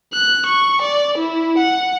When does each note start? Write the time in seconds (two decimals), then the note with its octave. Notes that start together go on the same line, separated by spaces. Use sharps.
0.13 F#6
0.46 C#6
0.82 D5
1.18 E4
1.58 F#5